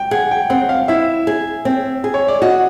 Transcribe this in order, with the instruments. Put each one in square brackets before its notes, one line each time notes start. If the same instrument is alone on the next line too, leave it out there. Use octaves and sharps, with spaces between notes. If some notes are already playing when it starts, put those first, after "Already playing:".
Already playing: [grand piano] G5
[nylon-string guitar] G#4 [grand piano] F#5
[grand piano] G5
[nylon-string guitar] C4 [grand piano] F#5
[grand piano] F5
[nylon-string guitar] E4 [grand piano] E5
[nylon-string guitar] G#4
C4
G#4
[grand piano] C#5
D5
[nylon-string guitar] F#4 [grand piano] D#5